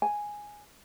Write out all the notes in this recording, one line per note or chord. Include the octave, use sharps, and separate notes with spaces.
G#5